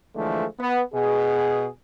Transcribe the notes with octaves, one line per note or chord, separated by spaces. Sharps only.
D3 E3 F3 G#3 A3
B3
B2 G#4